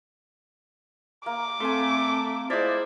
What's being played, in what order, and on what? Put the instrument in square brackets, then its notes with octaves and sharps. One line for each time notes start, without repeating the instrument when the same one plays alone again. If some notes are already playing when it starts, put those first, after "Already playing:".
[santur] A#3 [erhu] D6
[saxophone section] A3 [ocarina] C4 [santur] G#5 C6
[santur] G#3 D5 [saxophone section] E4 F4 C5